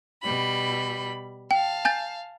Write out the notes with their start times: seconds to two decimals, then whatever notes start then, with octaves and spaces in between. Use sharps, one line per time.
0.22 B2 G3 B5
1.51 F5 G5 A5
1.85 G#5 G6 A6